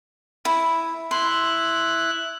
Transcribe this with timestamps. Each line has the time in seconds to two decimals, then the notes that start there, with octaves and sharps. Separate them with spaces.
0.45 E4
1.11 E4 C6 F#6